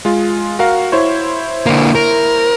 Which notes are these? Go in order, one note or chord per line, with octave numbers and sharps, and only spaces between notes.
G#3 F4
F#4 A#4 F5
E4 C5 C#5
D3 A#3
A#4